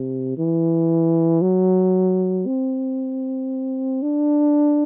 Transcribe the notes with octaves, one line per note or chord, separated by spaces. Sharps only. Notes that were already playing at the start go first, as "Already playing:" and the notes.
Already playing: C3
E3
F#3
C4
D4